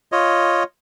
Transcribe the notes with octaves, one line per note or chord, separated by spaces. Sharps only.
F4 C#5 D#5